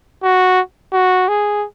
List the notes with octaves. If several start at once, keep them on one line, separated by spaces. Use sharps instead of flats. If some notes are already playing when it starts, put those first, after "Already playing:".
F#4
F#4
G#4